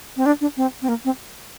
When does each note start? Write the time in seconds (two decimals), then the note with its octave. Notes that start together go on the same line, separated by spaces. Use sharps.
0.17 C4
0.26 D4
0.41 D4
0.57 C4
0.82 C4
0.88 A#3
1.05 C4